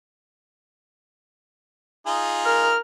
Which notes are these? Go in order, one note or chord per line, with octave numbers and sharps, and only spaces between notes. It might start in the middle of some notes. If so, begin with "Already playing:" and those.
D#4 F4 G#4
A#4 F6